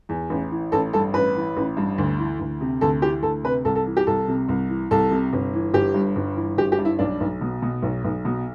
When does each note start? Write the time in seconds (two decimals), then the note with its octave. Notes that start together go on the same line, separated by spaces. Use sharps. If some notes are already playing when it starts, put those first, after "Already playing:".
0.09 E2
0.30 A1
0.51 E3
0.72 A1 A4
0.93 G2 A4
1.14 A1 B4
1.36 E3
1.57 A1
1.77 G2
1.98 D2
2.19 E3
2.40 D2
2.61 C3
2.81 D2 A4
3.02 E3 G4
3.23 D2 A4
3.43 C3 B4
3.65 C2 A4
3.75 A4
3.86 E3
3.97 G4
4.07 C2 A4
4.28 C3
4.49 C2
4.69 E3
4.91 C2 A4
5.11 C3
5.33 G1
5.53 E3
5.74 G1 G4
5.94 G2
6.16 G1
6.36 E3
6.57 G1 G4
6.72 G4
6.79 G2
6.85 E4
6.99 B1 D4
7.20 B1
7.41 B2
7.62 B2
7.82 B1
8.04 B1
8.25 B2